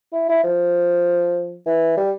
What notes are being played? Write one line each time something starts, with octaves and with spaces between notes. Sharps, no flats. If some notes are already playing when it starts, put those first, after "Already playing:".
E4
E4
F3
E3
G3